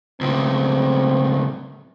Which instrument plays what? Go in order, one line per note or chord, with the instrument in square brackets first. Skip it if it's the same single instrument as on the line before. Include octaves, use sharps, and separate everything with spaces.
[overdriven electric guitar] C#2 A2 [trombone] C4